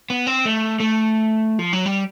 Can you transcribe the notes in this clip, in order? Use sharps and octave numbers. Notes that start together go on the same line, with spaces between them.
B3
C4
A3
A3
F3
F#3
G3